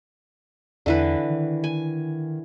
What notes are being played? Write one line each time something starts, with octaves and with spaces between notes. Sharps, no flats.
E2 D3 E3 B4
D#3
G#5